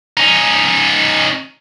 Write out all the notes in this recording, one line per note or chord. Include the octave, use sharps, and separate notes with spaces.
C#4 D#4